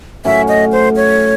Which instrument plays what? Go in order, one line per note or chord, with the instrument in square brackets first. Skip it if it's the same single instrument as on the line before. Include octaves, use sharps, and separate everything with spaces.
[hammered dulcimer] A2 F#3 C#4 [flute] E5
[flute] D#5
C5
C#5